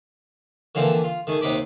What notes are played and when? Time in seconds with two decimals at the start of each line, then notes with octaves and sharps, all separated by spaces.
0.75 D3 E3 F3 A#3 C4 D4
1.04 F4
1.27 D#3 A3 G#4
1.41 D#2 C3 C4 D#4 B5 D6